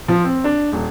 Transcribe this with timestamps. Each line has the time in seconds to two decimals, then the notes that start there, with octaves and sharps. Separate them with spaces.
0.08 F3
0.24 C4
0.44 D4
0.72 D#1